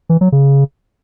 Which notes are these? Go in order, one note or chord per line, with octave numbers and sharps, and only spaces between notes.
E3
F#3
C#3